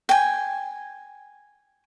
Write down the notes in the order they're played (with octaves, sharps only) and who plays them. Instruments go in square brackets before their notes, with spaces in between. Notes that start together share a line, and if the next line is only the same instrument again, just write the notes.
[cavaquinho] G5 G#5